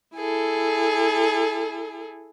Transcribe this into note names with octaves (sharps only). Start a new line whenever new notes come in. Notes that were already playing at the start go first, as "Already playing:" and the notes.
E4 G#4 A4